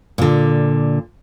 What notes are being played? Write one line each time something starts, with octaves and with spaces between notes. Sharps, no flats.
A#2 D3